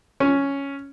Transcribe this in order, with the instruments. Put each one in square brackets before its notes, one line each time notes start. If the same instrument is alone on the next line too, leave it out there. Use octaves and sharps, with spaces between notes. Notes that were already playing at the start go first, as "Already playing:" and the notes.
[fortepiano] C#4